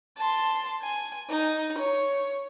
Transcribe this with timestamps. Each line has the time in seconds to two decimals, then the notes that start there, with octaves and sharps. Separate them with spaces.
0.18 A5 C6
0.82 G#5
1.30 D#4
1.78 C#5